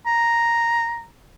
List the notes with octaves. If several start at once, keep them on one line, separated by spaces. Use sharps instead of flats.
A#5